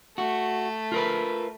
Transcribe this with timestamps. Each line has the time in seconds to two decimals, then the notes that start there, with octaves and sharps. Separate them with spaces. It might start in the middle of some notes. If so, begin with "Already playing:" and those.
0.18 A3 F#4
0.92 F4 A#4 B4